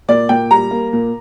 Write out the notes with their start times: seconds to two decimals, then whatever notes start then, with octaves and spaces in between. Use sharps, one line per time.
0.08 A#2 D5
0.29 A#2 G5
0.51 G3 A#5
0.71 A#3
0.93 A#2